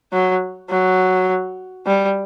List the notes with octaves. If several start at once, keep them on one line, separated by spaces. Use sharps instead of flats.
F#3
F#3
G3